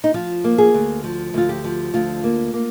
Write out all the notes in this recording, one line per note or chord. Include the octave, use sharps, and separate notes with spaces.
D#4
F3 F4
A#3
G#4
D2
F3
D2 F4
G4
F3
D2 F4
A#3
A#3